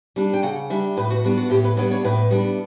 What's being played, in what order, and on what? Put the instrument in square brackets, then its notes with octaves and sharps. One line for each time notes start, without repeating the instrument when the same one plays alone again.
[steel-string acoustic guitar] G3 D4
G5
C#3 F#5
G3 D4 E5
A2 B4
F#4
G3 B3 D4
F#4
A2 G4
B4
G3 B3 D4 C#5
C#5
A2 B4
G3 B3 D4